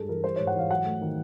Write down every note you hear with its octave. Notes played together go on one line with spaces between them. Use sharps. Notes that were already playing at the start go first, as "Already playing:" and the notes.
Already playing: G2 G#3 G#4 A4
E3 A#4
G3 C5
G#2 C#5
F#5
E3 F5
F#3 F#5
A3
D#3